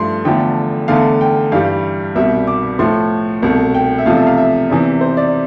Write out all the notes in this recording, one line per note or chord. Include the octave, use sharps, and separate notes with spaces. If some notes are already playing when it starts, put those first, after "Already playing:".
Already playing: G2 F3 A3 C6
E2 D3 F3 A3 G5
E2 D3 A3 F5
G5
G2 E3 G3 F5
C2 B2 G3 E5
D6
A2 F3 A3 C6
C2 B2 A3
G5
E5
E2 C3 F3 A3 F5
E5
F5
E5
E2 C3 E3
C5
D5